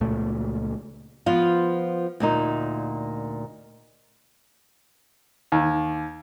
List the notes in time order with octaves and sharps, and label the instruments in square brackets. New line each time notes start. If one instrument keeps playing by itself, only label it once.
[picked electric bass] C#2 A#2 A3
[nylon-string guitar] F3 B3 F4
D2 A#2 D#4
[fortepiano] D#2